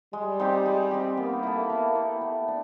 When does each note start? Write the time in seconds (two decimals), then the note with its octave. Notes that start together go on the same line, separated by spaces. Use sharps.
0.13 G3 G#3
0.40 C4 D#4 G4
0.66 G#3
0.91 C4 D#4 G4
1.17 A#3 B3
1.43 E4 A4
1.70 B3
1.95 E4 A4
2.21 A3
2.48 D4